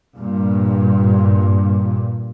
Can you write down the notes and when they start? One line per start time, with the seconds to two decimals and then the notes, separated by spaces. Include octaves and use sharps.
0.18 G2 A#2